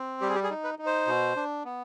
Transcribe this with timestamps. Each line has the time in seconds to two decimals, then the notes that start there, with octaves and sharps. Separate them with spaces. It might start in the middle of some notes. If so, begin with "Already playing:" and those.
Already playing: C4
0.21 G3 G4
0.29 G#4
0.35 G4
0.43 G#4
0.50 D#4
0.64 B4
0.79 D#4
0.86 C5
1.07 B2
1.37 D4
1.65 B3